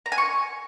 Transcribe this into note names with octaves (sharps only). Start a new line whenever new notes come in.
A#5
G#5
C#6